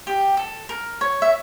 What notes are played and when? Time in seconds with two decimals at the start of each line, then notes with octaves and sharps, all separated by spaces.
0.07 G4
0.37 A4
0.69 A#4
1.01 C#5
1.22 E5